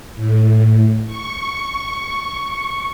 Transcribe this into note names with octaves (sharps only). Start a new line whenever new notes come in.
A2
C#6